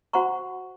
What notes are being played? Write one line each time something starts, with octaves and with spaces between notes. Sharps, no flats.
F#4 C5 F#5 A#5 C#6